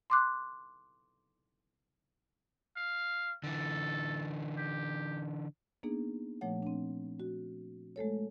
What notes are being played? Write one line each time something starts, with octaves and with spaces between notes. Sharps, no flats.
C6 D6 F#6
F5
D3 E3 A4
G4
A#3 B3 D4 D#4 G#4
A#2 F3 A3 C#5 F#5
C4 D4
F#4
G#3 A3 A4 C#5